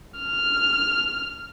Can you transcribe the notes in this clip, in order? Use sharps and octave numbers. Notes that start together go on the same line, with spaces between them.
F6